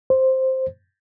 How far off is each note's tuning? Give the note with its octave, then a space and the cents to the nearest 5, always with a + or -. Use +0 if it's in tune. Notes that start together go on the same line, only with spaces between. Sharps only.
C5 +5